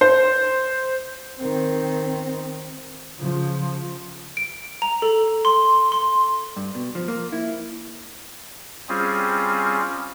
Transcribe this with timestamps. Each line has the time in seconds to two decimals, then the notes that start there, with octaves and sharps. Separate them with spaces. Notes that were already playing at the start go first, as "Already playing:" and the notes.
0.01 C5
1.40 D#3 C4
3.18 C#3 F3
4.37 D7
4.82 A#5
5.02 A4
5.45 C6
5.92 C6
6.57 G2
6.75 B2
6.95 F3
7.08 A#3
7.32 E4
8.89 G3 C4 C#4 F4 G#4